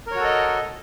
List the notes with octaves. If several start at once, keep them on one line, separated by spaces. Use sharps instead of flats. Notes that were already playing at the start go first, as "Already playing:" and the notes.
F#4 A4 A#4 C#5 D#5